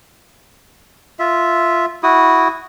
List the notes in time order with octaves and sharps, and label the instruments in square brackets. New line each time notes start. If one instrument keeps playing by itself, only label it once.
[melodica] F4 E5
E4 F#4 D#6